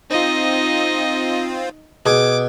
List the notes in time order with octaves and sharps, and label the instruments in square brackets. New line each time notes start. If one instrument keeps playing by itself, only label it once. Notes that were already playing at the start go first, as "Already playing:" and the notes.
[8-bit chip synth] C4 F4 [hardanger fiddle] D#4 D#5
[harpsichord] B2 G#4 [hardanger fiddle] D6